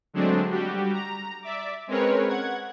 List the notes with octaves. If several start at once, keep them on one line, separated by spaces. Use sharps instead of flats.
D3 F#3 G#3 A3 C4 D4
G3 F#4 G4
A#5
D5 E5 D6
G#3 C4 C#4 A#4 B4 C#5
F#5 G#6